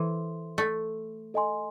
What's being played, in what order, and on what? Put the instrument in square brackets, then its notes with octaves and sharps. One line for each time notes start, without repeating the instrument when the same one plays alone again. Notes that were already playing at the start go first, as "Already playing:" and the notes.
Already playing: [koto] E3 [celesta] A4 C5 E5 C6
[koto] A3
[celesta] A4 D#5 G#5 C6